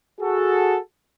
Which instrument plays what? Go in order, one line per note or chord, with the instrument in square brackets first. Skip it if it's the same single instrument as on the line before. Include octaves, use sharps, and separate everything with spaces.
[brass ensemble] F#4 G#4 A4